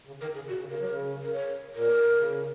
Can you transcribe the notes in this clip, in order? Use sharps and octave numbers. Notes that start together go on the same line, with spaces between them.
C#3
D#3 A#4
C#3 G#4
A#2 F#4
C#3
C#3 A#4
F#3
C#3
A#4
C#5
A#2 A#4
C#3